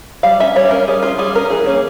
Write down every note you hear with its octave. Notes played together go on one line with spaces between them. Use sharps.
G3 F5
C#4 E5
G3 C#5
C#4 A#4
G3 G#4
C#4 F4
G3 G#4
C#4 A#4
E3 G#4
A#3 C#4